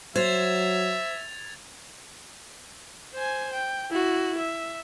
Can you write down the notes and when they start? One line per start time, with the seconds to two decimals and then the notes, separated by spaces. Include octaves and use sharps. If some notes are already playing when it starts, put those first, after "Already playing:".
0.16 F#3 C5 E5 G#6 A6 F7
3.14 C5 G#5
3.53 G5
3.90 E4 F#4
4.38 E5